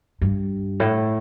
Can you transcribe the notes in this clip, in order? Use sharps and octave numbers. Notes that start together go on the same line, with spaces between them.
G2
A2